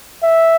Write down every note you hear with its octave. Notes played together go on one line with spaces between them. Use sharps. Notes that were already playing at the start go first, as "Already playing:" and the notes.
E5